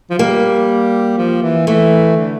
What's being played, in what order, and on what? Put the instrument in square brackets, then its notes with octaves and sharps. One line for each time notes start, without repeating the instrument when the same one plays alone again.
[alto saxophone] F3
[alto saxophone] G3 [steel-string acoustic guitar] A#3
[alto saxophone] F3
E3
[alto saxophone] E3 [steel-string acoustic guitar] A3
[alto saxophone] D3